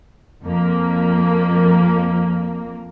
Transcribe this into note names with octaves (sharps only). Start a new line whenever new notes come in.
F2 A#3